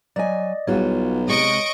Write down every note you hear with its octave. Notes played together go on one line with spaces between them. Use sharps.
F#3 D5 D#5 G#5
B1 G3 F4 F#4 C#5
C3 G#3 D#5 C#6 D7